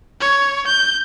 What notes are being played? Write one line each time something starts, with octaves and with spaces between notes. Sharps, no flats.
C#5
G6